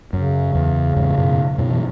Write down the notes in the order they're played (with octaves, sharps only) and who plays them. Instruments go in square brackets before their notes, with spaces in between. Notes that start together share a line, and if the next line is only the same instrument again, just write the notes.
[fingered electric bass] F#2 [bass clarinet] C#3
[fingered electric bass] E2
E2 G#2
F#2 B2
F#2 B2
E3